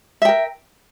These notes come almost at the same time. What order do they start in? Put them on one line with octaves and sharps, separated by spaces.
E5 G5 A#4